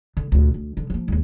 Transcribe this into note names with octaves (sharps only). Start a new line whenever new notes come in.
D3
D2 A#2
D2
D3 F3
F3 A#3
D#2 G#2